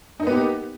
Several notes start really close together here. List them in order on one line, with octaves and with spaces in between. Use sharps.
D#4 A#3 B3 G4